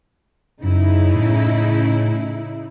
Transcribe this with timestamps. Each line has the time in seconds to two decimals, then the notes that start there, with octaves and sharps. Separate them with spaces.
0.63 F#2 C#3 D#4 E4
1.14 A2